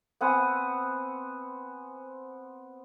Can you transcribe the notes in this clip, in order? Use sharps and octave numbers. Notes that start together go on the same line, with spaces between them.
B3 C4 F#5 G#5